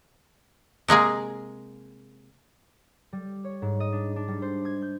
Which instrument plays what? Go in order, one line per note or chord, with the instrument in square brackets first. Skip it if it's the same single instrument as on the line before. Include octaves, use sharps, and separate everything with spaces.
[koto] C3 G#3 A#3 G#4
[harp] G3
C#5
G#2
D#5
D4
D4
G3
C5
G#6
G6